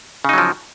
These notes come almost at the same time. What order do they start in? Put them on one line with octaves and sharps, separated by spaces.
C#3 D#4 F#3 F3